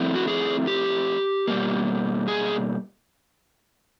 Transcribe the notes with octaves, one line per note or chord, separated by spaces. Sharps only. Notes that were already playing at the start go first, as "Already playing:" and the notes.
Already playing: F3 A3 C4 E4
F#4
G#4
G4
B2 G3 A#3
G#4